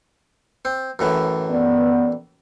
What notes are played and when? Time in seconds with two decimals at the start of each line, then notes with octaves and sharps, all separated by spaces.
0.65 C4
0.99 F#2 A2 E3
1.50 B3 D5